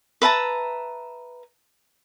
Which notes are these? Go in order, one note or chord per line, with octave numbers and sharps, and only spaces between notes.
B4 E5 A5 A#5